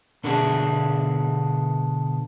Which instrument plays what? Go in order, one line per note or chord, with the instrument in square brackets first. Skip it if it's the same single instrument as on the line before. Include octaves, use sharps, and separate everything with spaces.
[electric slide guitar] B2 D3 B3 D4 G#4